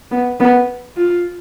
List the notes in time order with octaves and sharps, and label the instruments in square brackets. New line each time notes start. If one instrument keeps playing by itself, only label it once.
[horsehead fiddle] B3
B3
F4